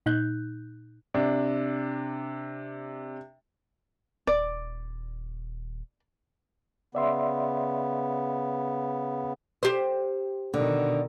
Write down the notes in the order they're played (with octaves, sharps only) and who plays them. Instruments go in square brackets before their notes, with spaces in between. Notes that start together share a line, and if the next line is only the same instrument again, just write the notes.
[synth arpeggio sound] A#2 D#4 F#6 G6
[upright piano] C3 D4
[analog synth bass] D#1 [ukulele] D5
[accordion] C#3 B3 [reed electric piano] D5 E5 C6
[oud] G4 C5
[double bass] B2 D#3 [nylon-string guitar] D3